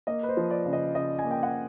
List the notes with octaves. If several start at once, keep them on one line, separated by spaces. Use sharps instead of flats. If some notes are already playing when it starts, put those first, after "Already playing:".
A#3 D#5
B4
C5
F3
D5
C#3
D#5
C#3 D#5
G#5
A#3
G5
F#5